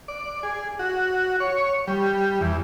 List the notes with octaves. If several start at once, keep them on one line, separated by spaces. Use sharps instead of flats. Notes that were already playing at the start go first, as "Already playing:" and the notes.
D5
G#4
F#4
C#5
G3
E2